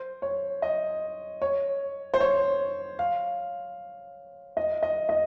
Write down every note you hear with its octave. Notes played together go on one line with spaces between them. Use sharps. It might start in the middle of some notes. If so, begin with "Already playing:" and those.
Already playing: C5
C#5
D#5
C#5
C5
C#5
F5
D#5
D#5
D#5